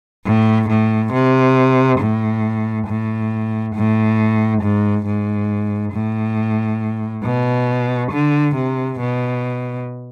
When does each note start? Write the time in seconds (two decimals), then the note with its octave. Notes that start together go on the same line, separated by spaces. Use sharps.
0.26 A2
0.69 A2
1.13 C3
2.00 A2
2.87 A2
3.75 A2
4.62 G#2
5.06 G#2
5.93 A2
7.24 B2
8.12 D3
8.55 C3
8.99 B2